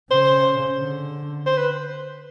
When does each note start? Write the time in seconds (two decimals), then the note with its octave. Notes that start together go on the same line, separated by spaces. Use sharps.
0.11 C#3 C5
0.80 D3
1.46 C5
1.57 B4